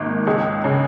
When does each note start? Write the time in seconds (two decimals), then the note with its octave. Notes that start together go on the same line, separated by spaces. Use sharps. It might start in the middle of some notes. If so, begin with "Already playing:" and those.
Already playing: G#1 D#3 A#3
0.27 C#2 G#4
0.64 C#3